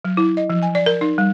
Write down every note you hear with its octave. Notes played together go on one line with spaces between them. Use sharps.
F#3
E4
D#5
F3
G#5
D5
A#4
D#4
G3